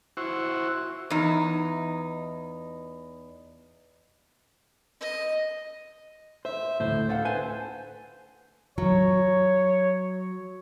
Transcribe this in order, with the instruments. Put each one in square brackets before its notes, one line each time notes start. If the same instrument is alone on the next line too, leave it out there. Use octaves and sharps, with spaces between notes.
[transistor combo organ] E4 F#4 C5 C#6
[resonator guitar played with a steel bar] E2 D#4
[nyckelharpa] D#5
[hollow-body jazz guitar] C5 [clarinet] E5
[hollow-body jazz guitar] D2 A2 [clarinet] C5
[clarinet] A4 [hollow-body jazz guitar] C5 F5 F#5
[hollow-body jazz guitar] B4 G#5 A5 [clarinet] C5
[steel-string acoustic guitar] F#3 [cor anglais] C#5